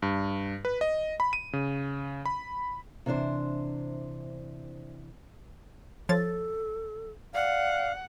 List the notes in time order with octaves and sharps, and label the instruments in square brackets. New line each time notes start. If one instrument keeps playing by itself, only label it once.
[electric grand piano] G2
B4
D#5
B5
D#7
C#3
B5
[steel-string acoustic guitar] C3 E3 D4 C5
[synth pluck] F3 C#5 A6 [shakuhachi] A4
[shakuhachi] D5 [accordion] F5 [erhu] F#5